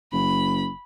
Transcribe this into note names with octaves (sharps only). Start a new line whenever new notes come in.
F#1 B5